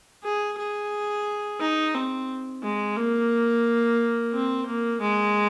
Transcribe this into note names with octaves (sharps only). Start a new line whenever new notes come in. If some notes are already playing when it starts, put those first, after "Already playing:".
G#4
G#4
D#4
C4
G#3
A#3
C4
A#3
G#3